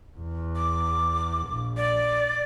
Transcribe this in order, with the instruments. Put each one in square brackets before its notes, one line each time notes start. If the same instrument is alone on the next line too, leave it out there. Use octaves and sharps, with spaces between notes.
[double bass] E2
[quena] D6
[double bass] A#1
[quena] D5